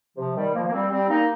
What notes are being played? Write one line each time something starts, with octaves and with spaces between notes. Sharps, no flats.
C3 F3
D#3 G3
F3 A#3
A#3
G3 C4
G3 C4
A#3 D#4